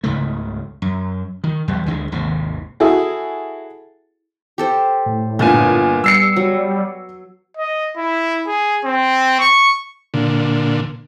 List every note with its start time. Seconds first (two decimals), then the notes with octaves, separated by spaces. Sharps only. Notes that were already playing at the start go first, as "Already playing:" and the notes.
0.04 C#2 G#2 C#3 A3
0.82 F#2
1.44 D#3
1.68 E2 G3
1.86 D2 D3 D#3 G#3
2.12 G#1 D#2 C3
2.80 E4 F#4 G#4 A4
4.58 G4 A4 C5
5.06 A2
5.39 G1 A#2 B3 G#5
6.04 G3 E6 C7 C#7
6.36 F#3
7.57 D#5
7.96 E4
8.47 G#4
8.84 C4
9.39 C#6
10.14 A#2 D3